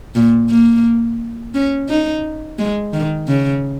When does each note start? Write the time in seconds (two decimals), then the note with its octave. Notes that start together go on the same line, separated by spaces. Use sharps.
0.15 A#2
0.50 A#3
1.54 C#4
1.89 D#4
2.59 G#3
2.93 D#3
3.28 C#3